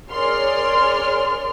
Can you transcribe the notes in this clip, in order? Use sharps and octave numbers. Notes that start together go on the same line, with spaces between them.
G#4 A#4 C#5 D5 C6 F6